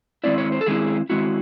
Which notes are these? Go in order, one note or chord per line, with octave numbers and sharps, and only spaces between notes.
D#3 G#3 C4 E4 D5
C#5
C5
A4
D#3 G#3 C4 E4 G#4
D#3 G#3 C4 E4 F#4